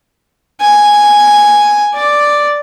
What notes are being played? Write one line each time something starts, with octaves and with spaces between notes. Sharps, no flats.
G#5
D5